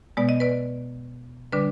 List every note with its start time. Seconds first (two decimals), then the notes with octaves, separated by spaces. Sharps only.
0.17 B2 G#3 B3 D5
0.29 D#5
0.40 B4 D5
1.52 D3 G3 D4 B4 D5